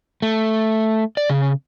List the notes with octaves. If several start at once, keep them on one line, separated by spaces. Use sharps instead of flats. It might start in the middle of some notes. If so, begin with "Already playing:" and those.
A3
D5
C#3